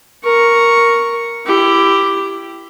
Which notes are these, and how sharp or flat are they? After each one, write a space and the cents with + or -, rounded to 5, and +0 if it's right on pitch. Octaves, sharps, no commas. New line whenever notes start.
A#4 +0 C#6 +0
E4 +20 G4 +0